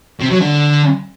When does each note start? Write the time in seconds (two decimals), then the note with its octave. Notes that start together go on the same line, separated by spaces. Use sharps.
0.20 C3
0.31 F#3
0.41 D3